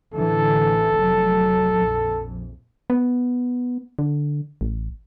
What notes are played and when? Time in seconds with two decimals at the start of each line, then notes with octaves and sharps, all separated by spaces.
0.15 A1 D3 E3 A4
0.96 F1 F#3
1.75 A#1 F2
2.90 B3
3.99 D3
4.61 A1